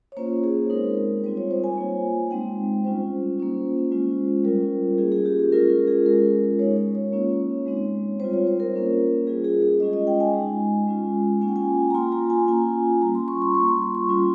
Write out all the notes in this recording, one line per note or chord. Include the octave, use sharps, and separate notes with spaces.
C#5
A#3 C#4 F4 C5
G#4
G#3 C4 D#4 A#4
G3 C4 F4 C5
C#5
C5
G#5
A#3 F4
G#3 C4 D#4 G5
G3 C#4 F4 C5
A#3 C#4 F4
G#3 C#4 F4
G3 C#4 F4 A#4
A#3 C#4 F4 G#4
G#4
G4
G#4
G#3 C#4 F4 A#4
A#4
G#4
G#3 C#4 F4 A#4
G#3 D#4 C#5
C#5
C#5
A#3 C#4 F4
G#3 C4 D#4
G3 C4 F4 C5
C#5
C5
A#4
A#3 C#4 F4
G3 C#4 F4 G#4
G#4
G#4
G#3 C#4 F4 D#5
D#5
G5
G#5
G#3 D#4
G#3 C#4 F4
A#3 C#4 F4 G#5
G5
G#5
A#5
A#3 F4 C6
A#5
G#5
A#3 C#4 F4 G#5
G3 C#4 F4 A#5
C6
C#6
C6
G3 A#3 F4 C#6
C6
C6
C#6
G3 C#4 F4 C6